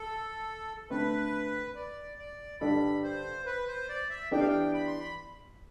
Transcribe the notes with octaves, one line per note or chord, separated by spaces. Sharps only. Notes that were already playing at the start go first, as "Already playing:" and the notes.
Already playing: A4
D3 A3 C4 B4
D5
D5
G2 D3 G3 D4 A4 B5
C5
B4
C5
D5
E5
E3 B3 D4 G4 G5
F5
G5
B5
C6
B5